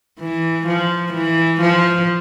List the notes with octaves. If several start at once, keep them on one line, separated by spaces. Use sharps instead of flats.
E3
F3
E3
F3